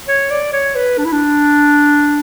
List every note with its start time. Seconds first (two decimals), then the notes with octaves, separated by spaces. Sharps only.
0.08 C#5
0.30 D5
0.53 C#5
0.75 B4
0.98 D4
1.05 E4
1.12 D4